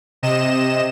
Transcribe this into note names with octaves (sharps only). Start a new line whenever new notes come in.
C3 D#5 E7